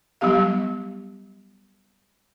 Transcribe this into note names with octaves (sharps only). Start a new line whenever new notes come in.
F#3 G3 B3 G4 F5